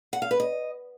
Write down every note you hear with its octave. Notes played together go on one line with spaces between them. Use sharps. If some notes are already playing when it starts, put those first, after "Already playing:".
F#5
F5
B4
D#5